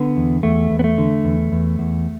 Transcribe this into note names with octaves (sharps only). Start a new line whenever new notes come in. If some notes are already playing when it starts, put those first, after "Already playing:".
Already playing: D3 B3
E2
E2 A3
E2
B3
A3
D3
E2
E2
E2